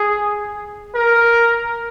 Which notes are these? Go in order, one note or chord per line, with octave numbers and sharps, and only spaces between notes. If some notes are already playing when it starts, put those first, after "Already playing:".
Already playing: G#4
A#4